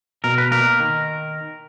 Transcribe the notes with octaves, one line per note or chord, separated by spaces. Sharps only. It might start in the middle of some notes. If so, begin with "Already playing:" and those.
B2 A#4
B4
A#3 A#4
D#3